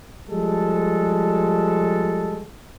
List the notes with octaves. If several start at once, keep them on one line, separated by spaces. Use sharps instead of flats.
F3 G3 G#3 A4